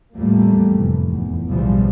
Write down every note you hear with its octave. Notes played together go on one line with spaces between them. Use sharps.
E2 A2 F3 G3 A3 A#3
F1 E3
E2
B1 A2 C#3 E3 F3 G3